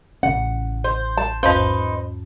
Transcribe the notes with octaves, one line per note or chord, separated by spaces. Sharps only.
A1 C#3 C#4 F#5
C5
A5
E2 G#2 D#4 B4 C5